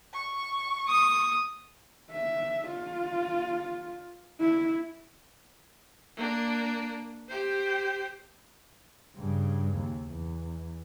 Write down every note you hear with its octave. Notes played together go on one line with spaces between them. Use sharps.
C#6
D#6
E5
F4
E4
A#3 D4
G4 C5
G2 C#3
D#2
E2